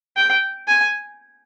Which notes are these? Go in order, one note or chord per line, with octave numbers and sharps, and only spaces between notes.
G5
G#5